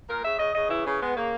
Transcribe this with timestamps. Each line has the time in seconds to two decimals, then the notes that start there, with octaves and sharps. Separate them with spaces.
0.08 A#2 A#4
0.24 C#3 E5
0.38 C#3 D#5
0.54 C#3 D#5
0.69 E3 E4
0.84 C#3 C#4
1.01 G#3 B3
1.16 C#3 A#3